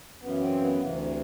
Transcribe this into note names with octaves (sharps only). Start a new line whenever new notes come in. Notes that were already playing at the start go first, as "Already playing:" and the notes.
F#2 C#3 E3 B3
C4
B3
D2 C3 E3